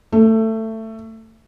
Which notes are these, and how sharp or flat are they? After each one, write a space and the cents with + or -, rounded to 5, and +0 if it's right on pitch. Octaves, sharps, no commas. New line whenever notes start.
A3 +15